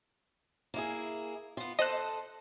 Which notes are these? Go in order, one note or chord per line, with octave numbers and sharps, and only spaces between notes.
A#3 E4 G#4
B3 F4
A4 C5 D#5 A5 F#6